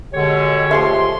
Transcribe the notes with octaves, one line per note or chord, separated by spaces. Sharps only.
B2 D3 G#3 G4 C#5
F3 A3 E5 C6